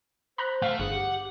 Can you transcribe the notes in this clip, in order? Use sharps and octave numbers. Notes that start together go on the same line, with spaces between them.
C5 A#5 B5 F#6
A3 F5
G1 G#4 F#5
G4